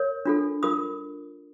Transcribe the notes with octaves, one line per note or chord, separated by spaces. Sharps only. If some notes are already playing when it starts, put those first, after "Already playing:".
Already playing: A#4 C#5
D4 F4 A4
F4 A#4 D#6